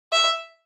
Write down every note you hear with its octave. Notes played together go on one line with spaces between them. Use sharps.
E5